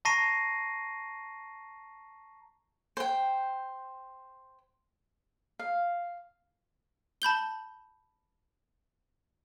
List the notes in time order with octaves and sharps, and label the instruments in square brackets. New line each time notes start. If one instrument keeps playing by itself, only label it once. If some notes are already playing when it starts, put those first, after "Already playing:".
[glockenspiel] A5 A#5 C#6 A#6 C7 D#7
[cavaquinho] C5 G5
F5
[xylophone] A5 B5 G6 G7